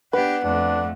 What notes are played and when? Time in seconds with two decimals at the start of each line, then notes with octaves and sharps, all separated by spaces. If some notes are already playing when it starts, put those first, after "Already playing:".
0.13 B3 D4 G4 B4 F#5
0.44 F2 A3 D4